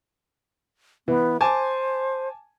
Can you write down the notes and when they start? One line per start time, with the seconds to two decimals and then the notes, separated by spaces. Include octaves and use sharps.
1.08 E3 B3
1.41 C5 G#5 A5 D6